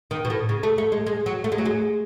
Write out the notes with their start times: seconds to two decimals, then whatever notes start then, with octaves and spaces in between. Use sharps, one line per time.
0.11 D#3
0.25 B2
0.30 A2
0.49 C#3
0.63 A3
0.78 A3
0.92 G#3
1.06 G#3
1.26 F#3
1.44 A3
1.52 G#3
1.58 F#3
1.66 G#3